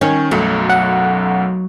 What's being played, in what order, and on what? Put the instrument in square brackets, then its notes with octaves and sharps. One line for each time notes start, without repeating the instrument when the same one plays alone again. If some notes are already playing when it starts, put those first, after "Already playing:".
[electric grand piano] D#3 [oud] C#4
[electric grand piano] B1 F#2 A3 [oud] F#3
[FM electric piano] F#5